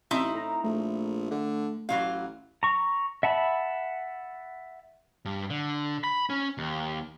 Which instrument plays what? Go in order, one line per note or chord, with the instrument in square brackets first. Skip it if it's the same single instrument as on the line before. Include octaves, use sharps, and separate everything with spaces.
[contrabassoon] A1 [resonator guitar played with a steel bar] C4 D#4 E4
[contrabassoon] A2 [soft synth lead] A#5
[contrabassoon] A#1 [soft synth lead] A3
[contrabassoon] D3
[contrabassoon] A1 [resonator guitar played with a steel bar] E3 F#3 F5
[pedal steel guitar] A#5 C#6
E5 F#5 A5 B5
[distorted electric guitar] G2
D3
B5
C#4
D#2